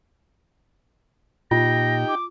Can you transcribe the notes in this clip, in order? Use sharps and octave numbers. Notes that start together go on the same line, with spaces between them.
A#2 D#4 F4 G4 G5 A#6
D6